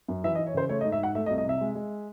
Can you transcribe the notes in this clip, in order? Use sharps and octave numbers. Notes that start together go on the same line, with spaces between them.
F#2
E3 E5
D#5
E3
C#5
C#3 C5
A3 C#5
D#5
G#2
E5
G#2 F#5
A3 E5
D#5
C2
D#5
C3 E5
G#3
G#3